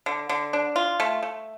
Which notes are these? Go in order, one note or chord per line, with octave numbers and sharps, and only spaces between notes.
D3
D3
D4
F4
A3
A3